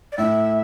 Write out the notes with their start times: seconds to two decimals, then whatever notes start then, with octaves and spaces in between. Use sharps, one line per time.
0.12 D5
0.18 A2 E5